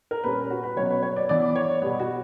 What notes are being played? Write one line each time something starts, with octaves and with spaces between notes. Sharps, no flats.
A#4
A#2 G3 C#4 B4
F#4
B4
B2 F#3 A#3 C#4 C#5
B4
C#5
D5
E3 B3 D5
C#5
B2 G3 B3
F#4